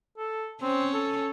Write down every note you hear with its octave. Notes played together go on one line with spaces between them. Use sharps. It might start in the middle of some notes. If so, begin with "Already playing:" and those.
A4
C4 C#4
A4